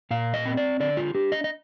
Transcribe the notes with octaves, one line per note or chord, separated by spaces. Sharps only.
A#2 F5
D#5
C4
D5
D3 D5
F4
D4 G4
D#5
D#5